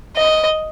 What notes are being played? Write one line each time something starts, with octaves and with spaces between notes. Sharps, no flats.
D#5